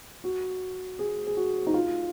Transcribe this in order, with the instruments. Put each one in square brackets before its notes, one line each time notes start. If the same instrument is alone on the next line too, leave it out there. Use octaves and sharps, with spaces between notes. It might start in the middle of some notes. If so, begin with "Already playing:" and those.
[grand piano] F#4
G#4
G#4
F#4
D#4
F4